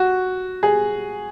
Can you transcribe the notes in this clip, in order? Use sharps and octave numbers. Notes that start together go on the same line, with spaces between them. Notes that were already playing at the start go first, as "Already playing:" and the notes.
Already playing: F#4
G#4